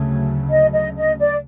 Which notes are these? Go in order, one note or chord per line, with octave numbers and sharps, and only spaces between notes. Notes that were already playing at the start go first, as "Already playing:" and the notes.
Already playing: D2 C#3 F#3 A3
D#5
D#5
D#5
D5